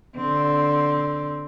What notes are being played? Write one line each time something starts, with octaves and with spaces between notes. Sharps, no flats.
D3 C4